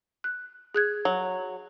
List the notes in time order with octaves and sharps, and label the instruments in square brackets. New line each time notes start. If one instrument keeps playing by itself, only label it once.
[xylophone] F#6
G#4 F#6 G#6
[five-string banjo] F#3